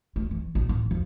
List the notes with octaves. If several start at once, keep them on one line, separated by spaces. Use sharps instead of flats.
A3
E3
A#1
A1
F2